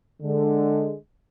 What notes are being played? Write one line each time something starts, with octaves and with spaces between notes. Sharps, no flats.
D3 G#3